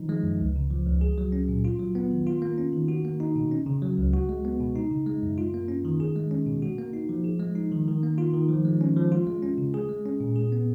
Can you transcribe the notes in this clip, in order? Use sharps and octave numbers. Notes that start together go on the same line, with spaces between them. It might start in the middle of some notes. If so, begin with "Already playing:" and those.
Already playing: D#3 F3 D#4
G#3
F#2
C#2
C#3
F3
C#2
G#4
F#3
C#4
A#2
F4
F#3
B3
D#3
F4
A#3
C#4
D#3
F#4
A#3
D#4
B2
C#4
C#3
F#3
C#2
F#4
G#3
B3
B2
D#4
C#3
G#3
F#2
F4
A#3
C#4
D#3
G#4
G#3
C#4
B2
F#4
A#3
D#4
F3
G#4
G#3
D#4
D#3
D#3
A#3
F4
D#3
F3
G#3
C#4
F3
F4
G#3
C#4
C#3
G#4
G#3
C#4
A#2
G#4
B3